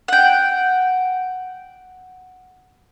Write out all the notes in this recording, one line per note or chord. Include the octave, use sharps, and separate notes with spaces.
F#5 G5